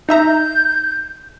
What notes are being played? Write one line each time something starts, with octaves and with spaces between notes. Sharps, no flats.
D#4 E5 A#5 G6